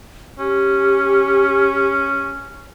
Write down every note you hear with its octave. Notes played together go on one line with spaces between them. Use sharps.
C#4 G4